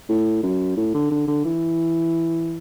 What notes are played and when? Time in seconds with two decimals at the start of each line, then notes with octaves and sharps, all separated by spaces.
0.09 A2
0.43 F#2
0.76 A2
0.94 D3
1.11 D3
1.27 D3
1.45 E3